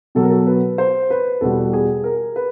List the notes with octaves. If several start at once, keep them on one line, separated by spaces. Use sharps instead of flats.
B2 F#3 A4
A#4
A4
B4
C5
B4
E2 B2 G3 A4
G#4
A#4
B4